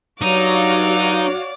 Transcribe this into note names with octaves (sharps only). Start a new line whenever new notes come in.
G2 F#3 D#4 F#4 C#5 D5 F5 D6